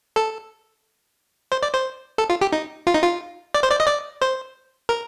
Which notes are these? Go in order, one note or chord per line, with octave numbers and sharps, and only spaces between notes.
A4
C5
D5
C5
A4
F4
G4
D#4
F4
D#4
F4
D5
C5
D5
D#5
D5
C5
A#4